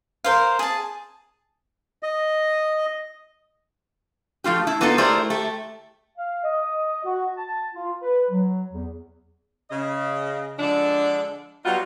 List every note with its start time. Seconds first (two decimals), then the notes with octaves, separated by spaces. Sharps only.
0.24 A#4 C5 F5
0.59 G#4 A5
2.03 D#5
4.44 F3 A3 F4 G4
4.67 E4
4.81 A#3 B3 D#4 F4 A4
4.98 A3 E4 G4 A#4 C5 D5
5.30 A3 G4
6.18 F5
6.44 D#5
7.04 F#4
7.37 A5
7.75 F4
8.01 B4
8.31 F#3
8.73 E2
9.71 C#3 D#5
10.59 D3 F3 G#3 D4
11.65 F#3 G3 B3 D#4 F4 F#4